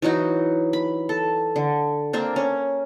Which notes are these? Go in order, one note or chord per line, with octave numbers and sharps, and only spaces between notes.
E3 F#3 D#4 F#4
B5
A4
D3
A#3 C4 D4
C#4